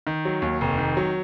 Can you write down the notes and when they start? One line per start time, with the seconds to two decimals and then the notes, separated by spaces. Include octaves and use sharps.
0.07 D#3
0.25 F#3
0.42 D#2
0.61 F1
0.78 D#3
0.97 F#3